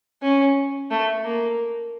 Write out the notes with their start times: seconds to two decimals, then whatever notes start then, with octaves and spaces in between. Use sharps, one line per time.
0.22 C#4
0.90 A3
1.24 A#3